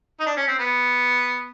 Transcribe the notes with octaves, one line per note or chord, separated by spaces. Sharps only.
D#4
D4
C#4
C4
B3